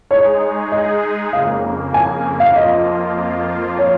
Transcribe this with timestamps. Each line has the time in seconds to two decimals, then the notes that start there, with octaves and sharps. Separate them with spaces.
0.11 G#3 D#4 G#4 C#5
0.72 D#5
1.33 F2 C#3 A#3 F5
1.94 G#5
2.40 F5
2.56 F2 F3 A#3 F4 D#5
3.78 C#5